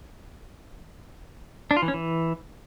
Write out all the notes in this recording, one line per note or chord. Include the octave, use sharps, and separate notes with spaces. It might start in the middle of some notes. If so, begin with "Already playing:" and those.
D4
F4
E3
C#4
E3